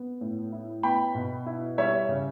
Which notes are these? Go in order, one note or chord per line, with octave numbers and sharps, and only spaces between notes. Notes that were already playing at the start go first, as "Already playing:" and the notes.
Already playing: B3
A2
E4
B3 G5 B5
B2
E4
G3 C#5 E5
C#3